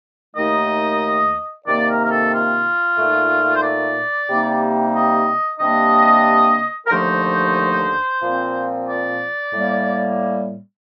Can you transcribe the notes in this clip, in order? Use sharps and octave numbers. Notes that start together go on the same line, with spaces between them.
D#2 D#3 A3 D#4 D#5
C3 D#3 A#3 D5
A#4
A#4
A4
F4
A#2 A3 D#4
C5
D5
C3 G3 A#3 D#4
D#5
C3 G3 A#3 D4 D#5
A#4
D#2 D3 F3 A3 D#4 C5
A#2 F3 C4
D5
A2 G3 A#3